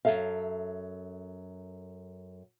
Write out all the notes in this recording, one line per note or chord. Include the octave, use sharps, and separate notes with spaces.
F#2 C#3 A4 E5 F5